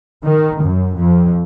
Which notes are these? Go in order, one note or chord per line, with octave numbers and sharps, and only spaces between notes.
D#3
F#2
F2